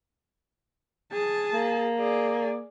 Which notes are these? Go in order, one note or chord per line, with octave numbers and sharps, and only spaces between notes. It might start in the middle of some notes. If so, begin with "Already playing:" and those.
G#4 A5
A#3
G#4 D5